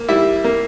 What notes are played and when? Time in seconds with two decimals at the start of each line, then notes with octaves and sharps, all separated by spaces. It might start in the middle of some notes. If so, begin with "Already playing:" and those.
Already playing: A#3
0.09 G3 E4 E5
0.44 A#3